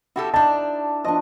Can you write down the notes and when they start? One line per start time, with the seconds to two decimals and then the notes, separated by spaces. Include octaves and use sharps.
0.16 E4 F#4 G4 A4
0.34 D4 D#4 A5
1.04 F3 D4 D#5